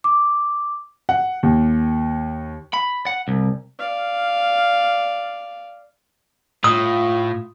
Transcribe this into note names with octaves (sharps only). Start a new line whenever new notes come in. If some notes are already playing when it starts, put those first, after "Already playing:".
D6
F#5
D#2
B5
F#5
C2
D5 F5
A2 F4 D#6